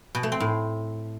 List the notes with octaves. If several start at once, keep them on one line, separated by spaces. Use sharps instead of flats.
B2
A3
C4
A2